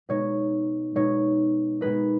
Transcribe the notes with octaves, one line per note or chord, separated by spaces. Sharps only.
B2 G#3 D#4 C#5
B2 G#3 D#4 C#5
B2 G#3 D#4 B4